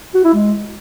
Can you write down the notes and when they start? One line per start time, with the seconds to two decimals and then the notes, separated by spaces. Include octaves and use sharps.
0.15 F#4
0.24 E4
0.34 G#3